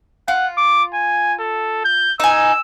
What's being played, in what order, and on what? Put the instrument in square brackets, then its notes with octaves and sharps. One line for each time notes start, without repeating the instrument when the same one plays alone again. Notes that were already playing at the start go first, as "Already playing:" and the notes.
[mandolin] F4 [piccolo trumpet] F#5
[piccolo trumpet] D6
G#5
A4
G6
[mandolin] D#4 G#5 [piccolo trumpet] E6